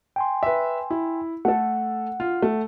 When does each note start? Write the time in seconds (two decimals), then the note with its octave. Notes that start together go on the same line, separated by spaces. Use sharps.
0.16 G5 G#5 C6
0.43 B4 E5
0.91 E4
1.45 A3 A4 F#5
2.20 F4
2.42 A3